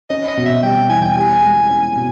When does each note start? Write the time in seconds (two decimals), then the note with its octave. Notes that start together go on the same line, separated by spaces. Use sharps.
0.10 C#4 D#5
0.28 D#5
0.37 B2
0.46 E5
0.63 G3 G5
0.89 E2 G#5
1.02 G5
1.13 G4 G#5
1.42 G#3
1.69 C#4
1.96 B2